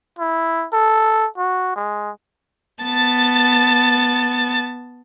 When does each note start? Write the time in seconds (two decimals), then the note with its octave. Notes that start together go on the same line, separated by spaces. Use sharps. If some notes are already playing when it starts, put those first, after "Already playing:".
0.19 E4
0.73 A4
1.38 F#4
1.76 G#3
2.81 B3 A5 A6